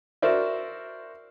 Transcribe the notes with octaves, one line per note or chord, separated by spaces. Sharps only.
F#4 A#4 C5 D5 E5